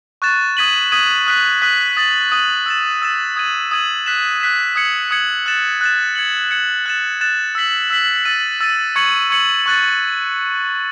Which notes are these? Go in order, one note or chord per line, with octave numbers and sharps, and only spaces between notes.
C#6 F#6 A6 E7
D#6 G#6 B6 D#7 F#7
D#6 G#6 B6 D#7 F#7
D#6 F#6 B6 D#7 F#7
D#6 F#6 B6 D#7 F#7
D#6 A6 D#7 F#7
D#6 A6 D#7 F#7
E6 A6 E7
E6 A6 E7
D#6 G#6 D#7 F#7
D#6 G#6 D#7 F#7
F#6 B6 E7
F#6 B6 E7
D#6 G#6 C#7 F#7
D#6 G#6 C#7 F#7
F#6 A6 E7
F#6 A6 E7
G#6 C#7 F#7
G#6 C#7 F#7
F#6 A6 E7
F#6 A6 E7
E6 B6 F#7
E6 B6 F#7
E6 A6 D#7
E6 A6 D#7
C#6 G#6 C#7 F#7
C#6 G#6 C#7 F#7
C#6 F#6 A6